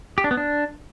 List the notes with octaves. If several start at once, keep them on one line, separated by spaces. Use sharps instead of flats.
G4
D4
B3
D4